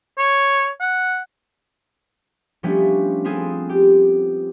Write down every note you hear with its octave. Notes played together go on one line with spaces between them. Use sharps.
C#5
F#5
F3 G3 A3 B3 C#4 D4
B3 C4 F4 G#4 A4
G4